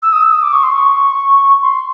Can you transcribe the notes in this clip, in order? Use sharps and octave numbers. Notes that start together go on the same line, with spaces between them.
E6
D#6
E6
D#6
D6
C#6
C6
C#6
C6